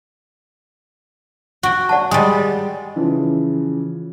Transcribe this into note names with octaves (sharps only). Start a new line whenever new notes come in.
F#4 G5
D5 F#5 A5
G3 G#3 D#5 D#6
C#3 E3 F3